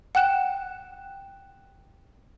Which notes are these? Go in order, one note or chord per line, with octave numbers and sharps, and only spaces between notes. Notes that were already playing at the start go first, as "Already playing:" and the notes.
F#5 G5 F#6 E7